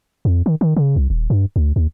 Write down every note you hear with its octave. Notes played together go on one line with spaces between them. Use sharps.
F2
D#3
D#3
C#3
C2
D#1
G2
D2
D#2